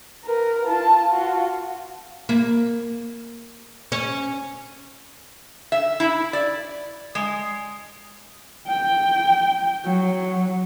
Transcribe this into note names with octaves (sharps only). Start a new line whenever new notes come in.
A#4 B4
F4 A5
F4 F#4
A#3
C#4
E5
E4
D5
G#3
G5
F#3